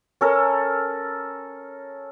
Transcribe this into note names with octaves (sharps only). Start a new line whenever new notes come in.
C#4 A4 A#4